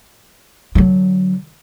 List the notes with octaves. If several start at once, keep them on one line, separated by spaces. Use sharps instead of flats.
D3 F#3